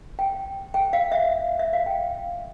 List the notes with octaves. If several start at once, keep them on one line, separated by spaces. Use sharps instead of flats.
G5
G5
F5
E5
E5
F5
G5